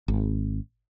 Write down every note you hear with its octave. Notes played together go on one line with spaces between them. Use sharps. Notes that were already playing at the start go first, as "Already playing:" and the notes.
G#1